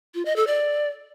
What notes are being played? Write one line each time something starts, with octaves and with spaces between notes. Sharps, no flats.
F4
D#5
A4
D5